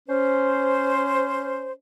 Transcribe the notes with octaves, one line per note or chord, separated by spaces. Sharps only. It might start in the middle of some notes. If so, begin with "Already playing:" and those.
C#4 C5